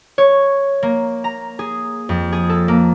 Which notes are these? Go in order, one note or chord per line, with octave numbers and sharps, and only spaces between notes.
C#5
A#3
A#5
G#4
F2
G#4
A4
A#3